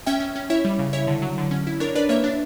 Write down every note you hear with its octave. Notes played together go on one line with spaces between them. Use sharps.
C#4 E5 G5
C#4
C#4
E4 C#5 E5
G3
C#3
E4 C#5 E5
D3
F#3
D3
C#4
E4
D4 A#4 C#5
D4 B4 D5
A#3 C#5 E5
D4